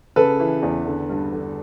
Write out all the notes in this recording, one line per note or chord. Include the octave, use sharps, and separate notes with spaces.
C#3 A4 B4
E3
E2
D3
G2
D3